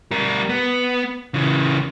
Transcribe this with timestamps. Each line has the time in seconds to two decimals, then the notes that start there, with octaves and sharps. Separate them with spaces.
0.11 G3 A#4
0.49 B3
1.34 C#3 E3